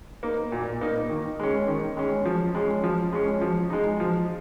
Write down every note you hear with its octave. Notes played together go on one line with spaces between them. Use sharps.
A#3 D#4
A#2
A#3 D#4
D#3
G#3 C#4
D#3
G#3 C#4
F3
G#3 C#4
F3
G#3 C#4
F3
G#3 D#4
F3